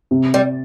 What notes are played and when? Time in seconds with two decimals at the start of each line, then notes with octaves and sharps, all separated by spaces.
0.11 C3
0.34 G3